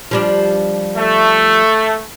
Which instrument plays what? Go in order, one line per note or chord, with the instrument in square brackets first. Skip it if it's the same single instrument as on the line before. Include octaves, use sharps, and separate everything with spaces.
[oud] F3 G3 D4
[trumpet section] A3